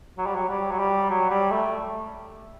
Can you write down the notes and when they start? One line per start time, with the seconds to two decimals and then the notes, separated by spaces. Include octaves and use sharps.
0.18 F#3
0.26 G3
0.35 F#3
0.49 G3
0.71 F#3
0.79 G3
1.10 F#3
1.30 G3
1.51 A3